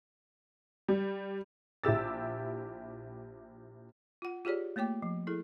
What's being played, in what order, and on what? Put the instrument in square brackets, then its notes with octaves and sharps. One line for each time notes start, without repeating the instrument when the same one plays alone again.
[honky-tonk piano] G3
A#1 E4 G4 E6 A6
[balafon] F4 F#5
F4 G4 G#4 C#5 D5
A3 A#3 C#5 G5 D6
F3
E4 G#4 A4